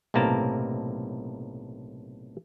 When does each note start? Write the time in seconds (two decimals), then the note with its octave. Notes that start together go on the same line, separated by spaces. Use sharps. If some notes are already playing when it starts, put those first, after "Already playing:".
0.14 B1 A2 C3 A#3 A#4 A5